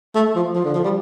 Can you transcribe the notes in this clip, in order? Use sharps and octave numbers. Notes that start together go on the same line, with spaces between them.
A3
F3
F3
D3
F3
G3